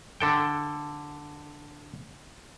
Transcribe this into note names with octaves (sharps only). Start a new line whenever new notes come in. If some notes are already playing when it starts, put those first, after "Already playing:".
D3 A4 G5